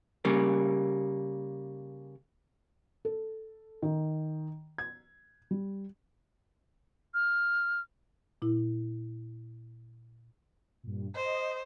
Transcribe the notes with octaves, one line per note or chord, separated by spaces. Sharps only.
C#3 G3 A#3
A4
D#3
G#6
G3
F6
A#2 E4
G2 A#2
C5 D#5